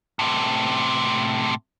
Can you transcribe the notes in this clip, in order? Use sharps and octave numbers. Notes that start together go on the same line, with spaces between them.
A2 C3